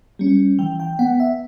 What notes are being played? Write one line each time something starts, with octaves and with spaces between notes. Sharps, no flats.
G3 C#4
E3 G5
G5
B3 F#5
E5